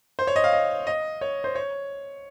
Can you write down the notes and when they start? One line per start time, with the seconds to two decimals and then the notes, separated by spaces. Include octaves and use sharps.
0.19 C5
0.27 C#5
0.36 D#5
0.44 F5
0.53 D#5
0.87 D#5
1.21 C#5
1.44 C5
1.55 C#5